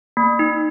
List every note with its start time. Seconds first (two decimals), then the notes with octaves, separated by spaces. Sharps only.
0.17 A#3
0.39 D#4